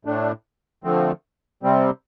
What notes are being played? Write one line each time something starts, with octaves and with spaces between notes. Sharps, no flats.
A2 A3 D4
D3 F3 A3 C4
C3 G3 C4